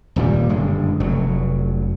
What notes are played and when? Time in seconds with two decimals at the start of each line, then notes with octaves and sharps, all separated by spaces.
0.16 D#1 A#2 G3
0.49 F#1 G2 D3 G#3
1.00 F1 F#3